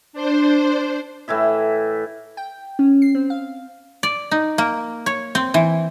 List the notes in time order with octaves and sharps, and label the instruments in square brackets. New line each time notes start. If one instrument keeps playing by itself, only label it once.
[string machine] D4 C5
[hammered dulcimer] A2 E3 E4 E5
[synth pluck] G5
C#4
C7
C4
F5
[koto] D5
D#4
A#3
C#5
C4
E3